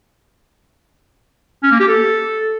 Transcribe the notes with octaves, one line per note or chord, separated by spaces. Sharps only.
C#4
A#3
G4
A4